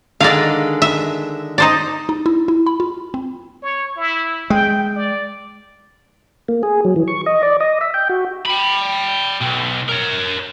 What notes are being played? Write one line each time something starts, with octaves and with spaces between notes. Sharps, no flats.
D3 D#3 G#3 D5 F5
E5
D#4 C5 D5
D#4
E4
E4
B5
F4
C4
C#5
E4
G#3 G5
D5
A#3
G#4
F#3
E3
C#6
D#5
D5
D#5
E5
G5
F#4
G5 B5
B1
A#4 C#5